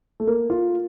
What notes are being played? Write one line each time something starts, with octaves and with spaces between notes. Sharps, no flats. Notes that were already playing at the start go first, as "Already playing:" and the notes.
A3
A#3
F4